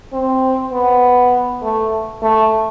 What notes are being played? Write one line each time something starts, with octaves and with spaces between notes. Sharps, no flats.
C4
B3
A3
A3